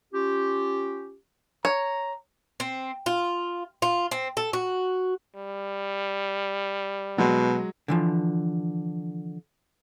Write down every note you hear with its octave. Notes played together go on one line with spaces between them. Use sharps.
C#4 F4 G4
C#5 A#5
C4
F4
F4
C4
A4
F#4
G3
B2 F#3 G#3
D3 E3 F3